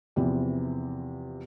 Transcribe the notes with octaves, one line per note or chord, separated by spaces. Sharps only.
E2 C3 E3 F3